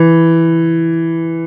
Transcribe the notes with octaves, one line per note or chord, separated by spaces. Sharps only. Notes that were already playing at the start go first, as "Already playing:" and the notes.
Already playing: E3